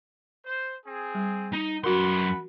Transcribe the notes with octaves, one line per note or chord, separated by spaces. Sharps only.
C5
C4 G#4
G3
D#4
F#2 F#4 A#4 F#5 B5 C6